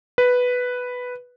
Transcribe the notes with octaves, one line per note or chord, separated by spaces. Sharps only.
B4